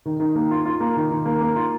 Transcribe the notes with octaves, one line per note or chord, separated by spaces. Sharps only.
D#3
D#3
A#3
F4
F4
A#3
D#3
D#3
A#3
A#3
F4